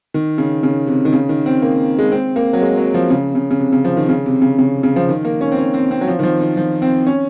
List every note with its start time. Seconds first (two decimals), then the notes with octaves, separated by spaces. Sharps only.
0.14 D#3
0.38 C#3
0.63 C#3
0.87 C3
1.05 D#3
1.13 C#3
1.29 D#3
1.46 C4
1.62 A#3
1.99 G#3
2.12 C4
2.36 A#3
2.53 F#3
2.61 G#3
2.77 F#3
2.94 F3
3.10 C#3
3.35 C#3
3.51 C#3
3.60 C3
3.73 C#3
3.85 F3
3.97 D#3
4.09 C#3
4.26 C3
4.42 C#3
4.58 C#3
4.83 C#3
4.96 F3
5.09 D#3
5.25 A#3
5.41 C#4
5.52 C4
5.58 C#4
5.74 C4
5.91 C4
6.01 F#3
6.07 F3
6.19 D#3
6.23 F3
6.40 D#3
6.57 F3
6.82 C4
7.07 C#4